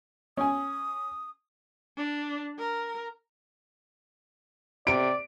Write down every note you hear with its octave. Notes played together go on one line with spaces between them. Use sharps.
C#4 G#5 D#6
D4
A#4
C3 D5 D7